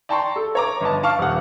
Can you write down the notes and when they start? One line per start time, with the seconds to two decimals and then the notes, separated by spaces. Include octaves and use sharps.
0.09 D5 G5 A5 A#5 C6 C#6
0.36 A4
0.55 C#5 A#5 D6
0.81 G1 D#5 A5
1.03 F5 A5 C#6 D6 F6
1.18 D#1 F#5